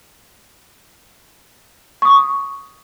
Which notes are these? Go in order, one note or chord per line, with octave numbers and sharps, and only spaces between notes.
C#6 D#6